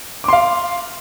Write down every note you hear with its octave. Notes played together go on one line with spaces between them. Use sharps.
F5 C6 D6